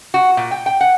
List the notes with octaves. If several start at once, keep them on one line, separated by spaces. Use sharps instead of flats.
F#4
A#2
G5
G5
F#5